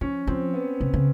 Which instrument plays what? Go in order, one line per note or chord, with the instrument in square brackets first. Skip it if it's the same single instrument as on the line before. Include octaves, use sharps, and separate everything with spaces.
[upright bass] F3 [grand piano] C#4
[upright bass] F3 [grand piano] C4
[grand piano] B3
[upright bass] C3
C#3